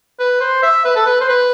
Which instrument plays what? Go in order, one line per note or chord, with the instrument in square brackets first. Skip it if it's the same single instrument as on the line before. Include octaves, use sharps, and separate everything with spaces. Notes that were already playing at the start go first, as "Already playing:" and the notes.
[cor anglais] B4
C5
E5
B4
A4
B4
C5
B4